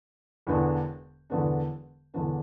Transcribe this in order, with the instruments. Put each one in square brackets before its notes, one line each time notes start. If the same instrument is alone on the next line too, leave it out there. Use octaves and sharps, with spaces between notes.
[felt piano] E1 E2 D3 B3 D4
E1 E2 D3 B3 D4
E1 E2 D3 B3 D4